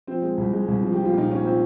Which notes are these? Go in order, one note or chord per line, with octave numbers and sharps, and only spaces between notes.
F3 C4
G#3
C2
G#3
C2
F3
G4
F3
F4
A#2 D#4
F3 C#4
A#2 C4